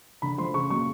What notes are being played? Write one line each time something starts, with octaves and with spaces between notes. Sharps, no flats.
D3 B5
F3 A3 C6
C#3 C#6
F#3 A#3 C#6